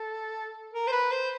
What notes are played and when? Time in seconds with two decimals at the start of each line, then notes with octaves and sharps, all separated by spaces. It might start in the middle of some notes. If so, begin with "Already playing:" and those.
Already playing: A4
0.74 A#4
0.87 C5
0.92 B4
1.11 C5